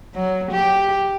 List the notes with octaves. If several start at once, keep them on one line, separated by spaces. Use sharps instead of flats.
F#3
G4